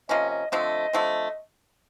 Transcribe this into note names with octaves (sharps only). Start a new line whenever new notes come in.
C3 F3 A#3 C#4 D#5
D#5
D3 F3 A3 C4 D#5
D3 F3 A3 C4